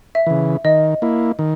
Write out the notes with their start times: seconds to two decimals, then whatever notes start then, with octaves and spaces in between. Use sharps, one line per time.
0.15 E5
0.26 C#3 E3
0.64 D#3 D#5
1.02 A#3 E4
1.39 D#3